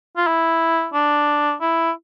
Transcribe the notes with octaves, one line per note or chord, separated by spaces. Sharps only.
F4
E4
D4
E4